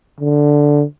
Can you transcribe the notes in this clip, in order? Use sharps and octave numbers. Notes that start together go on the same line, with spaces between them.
D3